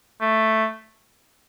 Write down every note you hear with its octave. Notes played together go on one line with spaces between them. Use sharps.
A3